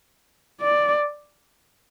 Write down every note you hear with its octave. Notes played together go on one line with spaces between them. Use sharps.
D5